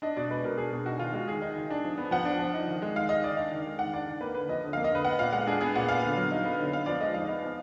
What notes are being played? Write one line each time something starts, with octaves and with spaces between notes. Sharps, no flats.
D4 D#5
B2 D5
G#3 B4
B2 A#4
D4 G#4
B2
D#4 F#4
D#3 F4
G#3 F#4
D#3 G#4
D#4
D#3
D4
F3
B3
F3 F#5
D4
F3
D#4
D#3
G#3
D#3 F5
D#4 D#5
D#3 D5
D4 F5
D#3
G#3
D#3 F#5
D4 D5
D#3
A#3 B4
D3 B4
F3 D#5
D3
A#3 F5
D#5
D3 B4
B3 F#5
A#2 F5
G#3 F#5
D4 G#4
B3 G#4
A#2 F#5
B3 F5
D3
F#3
D#4
B3
D3
B3 F5
F3 D5
G#3 D#5
D#4 F5
B3
F3